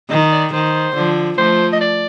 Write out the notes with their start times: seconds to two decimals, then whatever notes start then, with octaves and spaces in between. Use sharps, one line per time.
0.10 D#3 D#5
0.32 D5
0.53 D#3 C5
0.95 D3 F3
1.38 F3 A3 C5
1.73 D#5
1.81 D5